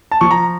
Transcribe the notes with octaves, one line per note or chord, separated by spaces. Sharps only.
A5
F3 C#6
A#5